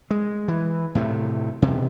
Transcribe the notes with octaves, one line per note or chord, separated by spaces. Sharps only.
G#3
E3
A2 C3 A3
E1 C3